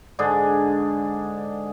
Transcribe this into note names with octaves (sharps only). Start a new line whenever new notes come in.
G#2 D3 D4 G#4